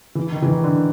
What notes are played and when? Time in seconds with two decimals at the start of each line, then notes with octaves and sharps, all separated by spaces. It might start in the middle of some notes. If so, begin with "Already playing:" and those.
0.15 E3
0.32 D#3
0.42 E3
0.48 D#3
0.64 D3